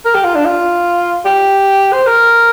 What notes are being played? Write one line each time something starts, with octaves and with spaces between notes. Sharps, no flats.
A#4
G4
F4
D4
F4
G4
C5
A#4